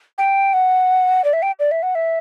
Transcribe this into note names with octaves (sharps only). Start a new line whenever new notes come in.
G5
F#5
D5
E5
G5
D5
E5
F#5
E5